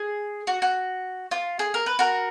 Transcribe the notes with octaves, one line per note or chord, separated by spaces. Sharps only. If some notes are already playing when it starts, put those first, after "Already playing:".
Already playing: G#4
F#4
F#4
F4
G#4
A#4
B4
F#4 A#4